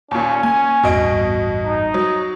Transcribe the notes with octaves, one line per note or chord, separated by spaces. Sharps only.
D#2 A#2 C#4
A#3 G#5
A1 E2 G2 B2 D#5 D7
D#4
F#3